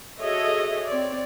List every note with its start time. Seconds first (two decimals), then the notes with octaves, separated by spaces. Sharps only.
0.20 F#4 G#4 A4 C#5 D#5 E5
0.88 C4 C#5 D5